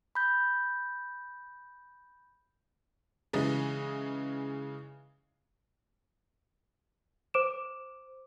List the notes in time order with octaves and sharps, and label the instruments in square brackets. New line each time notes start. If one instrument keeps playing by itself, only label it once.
[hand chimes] B5 G6
[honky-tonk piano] C#3 E3 G#3 D#4
[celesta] C5 D6 D7 E7